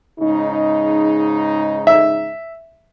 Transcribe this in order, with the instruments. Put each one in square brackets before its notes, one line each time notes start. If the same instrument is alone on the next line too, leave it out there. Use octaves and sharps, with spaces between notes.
[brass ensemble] G#2 C#3 D#4
[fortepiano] E5